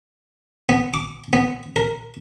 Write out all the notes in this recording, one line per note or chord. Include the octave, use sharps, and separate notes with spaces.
B3
D6
B3
A#4